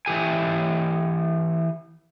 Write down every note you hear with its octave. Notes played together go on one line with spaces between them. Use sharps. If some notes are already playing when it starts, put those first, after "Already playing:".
E3 G4 G#5